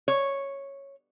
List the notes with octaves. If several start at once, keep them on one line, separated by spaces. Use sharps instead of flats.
C#5